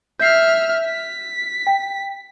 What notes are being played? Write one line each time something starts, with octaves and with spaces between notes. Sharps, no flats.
E5 F6 G6 C7
B6
G5